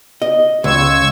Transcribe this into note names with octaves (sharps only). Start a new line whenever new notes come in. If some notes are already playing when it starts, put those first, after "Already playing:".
D#5
C#2 C#6 E6 G#6